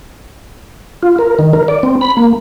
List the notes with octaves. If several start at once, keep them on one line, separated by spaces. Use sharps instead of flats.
F4
A#4
D#3
A#4
D5
C4
B5
A#3